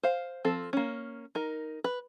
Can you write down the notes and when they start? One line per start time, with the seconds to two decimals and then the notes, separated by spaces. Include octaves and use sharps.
0.03 C5 F5
0.45 F3 C4 A4
0.73 A#3 C#4
1.35 D#4 A#4
1.84 B4